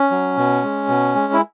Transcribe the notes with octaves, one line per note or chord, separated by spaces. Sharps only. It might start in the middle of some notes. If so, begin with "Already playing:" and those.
Already playing: C#4
F#3
B2
G#3
B2
G#3
E4